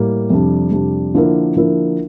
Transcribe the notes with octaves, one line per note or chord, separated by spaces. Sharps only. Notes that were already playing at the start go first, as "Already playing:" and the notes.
Already playing: A2 G3 A#3
F2 C3 G3 D4
F2 C3 G3 D4
D3 F3 A#3 E4 A#4
D3 F3 A#3 E4 A#4